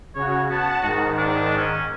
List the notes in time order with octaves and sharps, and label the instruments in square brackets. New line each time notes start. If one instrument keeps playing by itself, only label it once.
[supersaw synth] C#3 F#4 [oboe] C#5
[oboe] B3 [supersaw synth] F#5 A5
[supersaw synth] G#2 D#3 [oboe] F#4
[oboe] D4
C#4